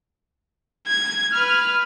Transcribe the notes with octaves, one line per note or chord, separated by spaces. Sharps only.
G#6
B4 F6